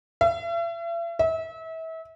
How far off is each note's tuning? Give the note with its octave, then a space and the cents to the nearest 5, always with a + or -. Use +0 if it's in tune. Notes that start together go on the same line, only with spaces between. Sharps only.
E5 +45
E5 -30